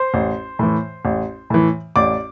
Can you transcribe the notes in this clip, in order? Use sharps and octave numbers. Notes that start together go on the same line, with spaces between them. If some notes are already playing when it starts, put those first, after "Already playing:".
Already playing: C5 C6
A1
A2 E3
A1
A2 E3
A1 D5 D6